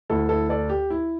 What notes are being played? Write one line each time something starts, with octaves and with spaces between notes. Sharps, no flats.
D2 D3 E4 A4
E4 A4
A4 D5
G4
E4